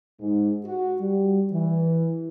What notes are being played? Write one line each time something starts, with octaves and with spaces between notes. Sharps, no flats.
G#2
F#4
G3
E3